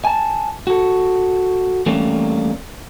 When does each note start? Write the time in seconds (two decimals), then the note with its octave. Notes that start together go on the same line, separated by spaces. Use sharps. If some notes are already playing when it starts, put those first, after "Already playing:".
0.05 G#5 A5
0.67 F#4 A4
1.86 E3 G3 A3 A#3 C4 C#4